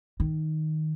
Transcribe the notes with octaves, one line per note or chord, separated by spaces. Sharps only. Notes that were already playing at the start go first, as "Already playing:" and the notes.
D#3